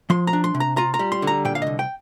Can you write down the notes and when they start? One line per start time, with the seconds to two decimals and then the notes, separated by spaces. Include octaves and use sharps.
0.10 F3 C6
0.27 A#5
0.33 D4
0.44 C6
0.55 C3
0.60 A#5
0.77 F4 A#5
0.94 A#5
0.99 G3
1.12 C6
1.22 D3
1.27 A#5
1.45 A#2 G5
1.55 F5
1.62 C2 D#5
1.79 G5